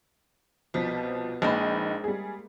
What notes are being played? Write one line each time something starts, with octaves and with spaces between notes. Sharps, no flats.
C2 B2 F3 B6
A#1 G#3 A#3 D#4 B4 C5
G3 G#4